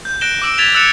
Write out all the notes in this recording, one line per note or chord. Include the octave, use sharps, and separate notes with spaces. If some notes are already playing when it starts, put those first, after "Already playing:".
G6
F#6 A#6 D7 E7 G7
D6 E6 D7
G#6 A6 B6 F7 G7
E6 F#6 A6 C#7 E7